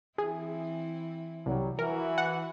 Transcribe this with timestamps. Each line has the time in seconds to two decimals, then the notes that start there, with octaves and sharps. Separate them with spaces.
0.18 E3 C4 E4 G#4
1.46 C2 F#3 G3
1.79 E3 F#4 A#4
2.18 F#5